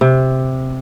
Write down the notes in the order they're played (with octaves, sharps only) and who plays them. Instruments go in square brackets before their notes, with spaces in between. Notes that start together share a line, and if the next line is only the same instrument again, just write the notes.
[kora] C3